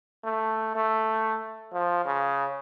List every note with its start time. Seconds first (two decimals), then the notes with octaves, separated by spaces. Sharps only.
0.24 A3
0.75 A3
1.73 F3
2.05 C#3